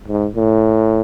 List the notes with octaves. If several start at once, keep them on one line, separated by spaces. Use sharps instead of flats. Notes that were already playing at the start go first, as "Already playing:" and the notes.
G#2
A2